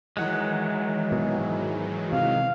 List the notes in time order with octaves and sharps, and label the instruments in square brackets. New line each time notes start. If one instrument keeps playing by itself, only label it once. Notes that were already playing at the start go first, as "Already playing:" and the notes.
[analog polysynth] D#3 E3 F#3 [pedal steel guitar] G#3 F#5
[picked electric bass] B2
G#2
[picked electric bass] C3 [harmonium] F5